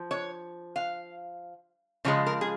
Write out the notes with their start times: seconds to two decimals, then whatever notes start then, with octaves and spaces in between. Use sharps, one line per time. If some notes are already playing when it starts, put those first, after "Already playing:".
Already playing: F3
0.11 C#5
0.76 F5
2.05 C#3 F3 G#3 C#5
2.26 A#4
2.41 G#4